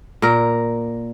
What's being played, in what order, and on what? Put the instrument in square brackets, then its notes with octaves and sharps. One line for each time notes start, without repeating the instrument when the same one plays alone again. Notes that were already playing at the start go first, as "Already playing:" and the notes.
[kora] A#2 A#4